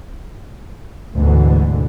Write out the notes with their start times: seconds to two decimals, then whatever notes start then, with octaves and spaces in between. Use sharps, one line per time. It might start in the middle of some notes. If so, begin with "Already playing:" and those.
1.16 D2 G#2 B2 D3 E3